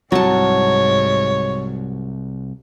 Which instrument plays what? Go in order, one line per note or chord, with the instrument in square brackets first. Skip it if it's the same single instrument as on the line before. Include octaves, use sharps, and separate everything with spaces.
[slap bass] C2 [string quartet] G#2 [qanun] F#3 A5 [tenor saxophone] C#5